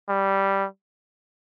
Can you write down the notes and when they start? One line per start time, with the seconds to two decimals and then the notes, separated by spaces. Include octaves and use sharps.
0.09 G3